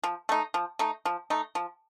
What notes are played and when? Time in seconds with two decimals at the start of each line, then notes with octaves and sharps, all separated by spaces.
0.04 F3
0.29 A3 D#4
0.54 F3
0.79 A3 D#4
1.05 F3
1.30 A3 D#4
1.55 F3